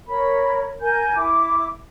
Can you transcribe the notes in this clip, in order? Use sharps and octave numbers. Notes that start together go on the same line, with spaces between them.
A#4 C#5 B5
A#4 G#5 G6
E4 D6